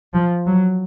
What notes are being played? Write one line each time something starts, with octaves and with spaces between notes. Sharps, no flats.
F3
F#3